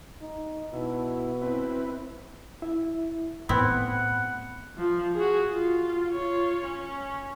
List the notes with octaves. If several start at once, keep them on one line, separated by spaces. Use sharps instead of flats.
D#4
B2 E4
C4 E4 B4
E4 E5
A2 B3 C4 E4 F#5 B5
F3
F#4 G#4
F4
F4 C#5
C#4